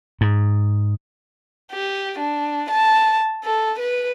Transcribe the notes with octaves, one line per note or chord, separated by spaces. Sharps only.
G#2
G4
D4
A5
A4
B4